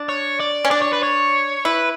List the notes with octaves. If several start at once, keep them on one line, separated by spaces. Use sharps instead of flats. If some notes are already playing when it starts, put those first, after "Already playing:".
Already playing: D4
C#5
D5
C#4
D4 D5
C#5
B4
C#5
E4 B4